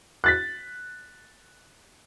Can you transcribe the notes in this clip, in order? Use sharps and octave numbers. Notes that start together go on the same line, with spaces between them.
F#6 A6 B6